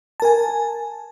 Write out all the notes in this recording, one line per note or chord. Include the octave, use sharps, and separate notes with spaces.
A#4 G#5 A5